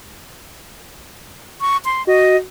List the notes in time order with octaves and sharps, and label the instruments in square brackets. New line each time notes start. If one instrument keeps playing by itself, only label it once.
[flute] C#6
C6
[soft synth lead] F#4 [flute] D#5